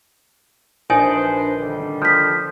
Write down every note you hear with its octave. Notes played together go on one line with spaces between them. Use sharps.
A#1 D4 D#4 B4 C5 D5 G#5
D3 D#3 G3
F3 G6 B6